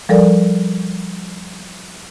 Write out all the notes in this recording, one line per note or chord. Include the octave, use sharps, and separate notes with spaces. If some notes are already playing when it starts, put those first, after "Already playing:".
F3 G3 A4 A#4 D5